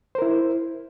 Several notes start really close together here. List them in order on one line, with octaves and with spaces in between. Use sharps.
C5 A#4 E4